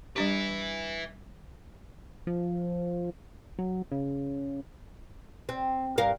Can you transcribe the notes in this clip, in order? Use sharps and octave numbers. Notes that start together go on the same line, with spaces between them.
G3 D4 G4 B4 E5
F3
F#3
C#3
C4
G2 A#4 F5